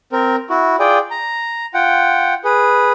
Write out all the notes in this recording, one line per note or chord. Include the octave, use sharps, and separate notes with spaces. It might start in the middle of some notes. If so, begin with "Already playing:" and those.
C4 A#4
E4 F#4
F4 G#4 D5 G5
A#5
F4 F#5 G5
G#4 B4